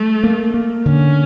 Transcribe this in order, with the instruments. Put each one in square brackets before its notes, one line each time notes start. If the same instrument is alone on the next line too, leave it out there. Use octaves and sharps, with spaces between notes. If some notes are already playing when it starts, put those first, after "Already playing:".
Already playing: [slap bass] G3 [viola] A3
[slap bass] A#3
A#3
[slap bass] D3 [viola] C#4